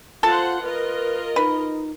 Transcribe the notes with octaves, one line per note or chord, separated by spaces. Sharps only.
F4 A4 C5 F#5 A5 C6
F4 A#4 B4 D#5
D#4 B4